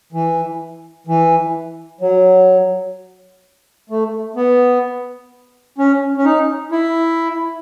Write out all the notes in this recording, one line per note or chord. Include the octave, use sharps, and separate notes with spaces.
E3
E3
F#3
A3
B3
C#4
C#4
D#4
E4